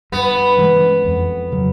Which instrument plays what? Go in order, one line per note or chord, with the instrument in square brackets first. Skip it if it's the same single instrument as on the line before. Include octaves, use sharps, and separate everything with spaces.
[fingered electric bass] G2 [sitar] B3
[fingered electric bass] E3 G#3 C#4
F2
C#3 F#3